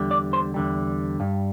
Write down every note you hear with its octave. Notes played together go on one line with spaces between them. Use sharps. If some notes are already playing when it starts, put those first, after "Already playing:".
Already playing: E2 D3 G3
D5
C5
E2 D3 G3
G2 G3